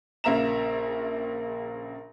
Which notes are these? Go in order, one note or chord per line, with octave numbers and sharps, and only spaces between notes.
A#1 C#3 A#3 E5 A#5 E7